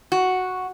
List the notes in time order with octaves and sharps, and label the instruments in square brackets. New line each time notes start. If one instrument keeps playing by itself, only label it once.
[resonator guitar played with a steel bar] F#4